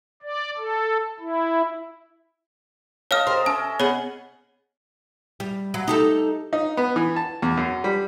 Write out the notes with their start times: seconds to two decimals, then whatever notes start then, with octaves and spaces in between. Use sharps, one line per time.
0.22 D5
0.58 A4
1.19 E4
3.11 A4 C#5 D#5 F5 F6
3.27 G4 A#4 C5
3.46 C#4 E5 A5
3.80 B3 G#4 C#5 F#5
5.40 G3
5.74 F#3
5.88 D#4 G4 A4
6.53 D#4
6.77 B3
6.96 E3
7.16 A5
7.42 E2
7.57 F#2
7.84 G3